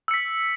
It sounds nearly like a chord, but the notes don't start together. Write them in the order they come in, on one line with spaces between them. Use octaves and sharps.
E6 C#7 B6